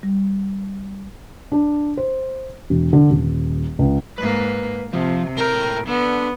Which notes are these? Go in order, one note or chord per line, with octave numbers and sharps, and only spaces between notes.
G3
D4
C5
E1
D3
D#1
C#2
G#2 A#3 B4
C3 F3
A2 A#4 G5
D3 B3